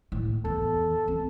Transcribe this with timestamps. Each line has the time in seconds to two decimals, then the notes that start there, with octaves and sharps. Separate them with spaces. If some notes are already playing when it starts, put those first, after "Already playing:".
0.12 A2
0.45 E2 A4
1.08 C4